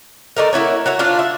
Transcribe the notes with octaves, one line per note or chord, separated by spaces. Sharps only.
A3 D4 D#4 A#4
A#3 E4 F#4 C#5
F#4 C#5 E5
D4 F4 C5
E5